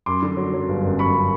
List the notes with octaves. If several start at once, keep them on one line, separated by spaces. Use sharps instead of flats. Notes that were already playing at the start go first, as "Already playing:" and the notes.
F#2 C6 D6
D3
F#3
F#3
G1
F#2
F#2 B5 C#6